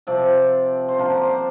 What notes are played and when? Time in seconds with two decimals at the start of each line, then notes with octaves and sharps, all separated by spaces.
0.07 C3 F3 C4 D5
0.89 C5
0.98 D3 F3 A#3 D4 A#4
1.14 C5
1.29 D5